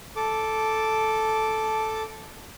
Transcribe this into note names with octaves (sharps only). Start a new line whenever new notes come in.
A4 D6